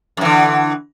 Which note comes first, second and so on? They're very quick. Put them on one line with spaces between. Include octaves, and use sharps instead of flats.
F#2 E3 D3